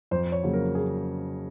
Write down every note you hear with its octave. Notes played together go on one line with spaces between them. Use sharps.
F2 C5
C#5
C#3 F#3 A#3
A#4
G#4